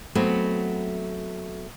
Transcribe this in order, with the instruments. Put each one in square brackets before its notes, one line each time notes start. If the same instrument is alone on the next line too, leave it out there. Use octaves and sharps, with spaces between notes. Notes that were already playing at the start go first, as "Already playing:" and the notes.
[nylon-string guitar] F#3 A3 B3 C4